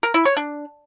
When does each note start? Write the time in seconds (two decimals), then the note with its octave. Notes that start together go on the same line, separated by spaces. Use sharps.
0.03 A#4
0.14 E4
0.25 C#5
0.37 D4